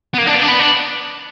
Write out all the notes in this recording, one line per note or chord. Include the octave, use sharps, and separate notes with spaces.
B3
A#3
D4
B3
D4
B3
D4